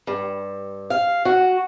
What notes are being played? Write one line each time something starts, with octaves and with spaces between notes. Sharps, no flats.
G2
F5
F#4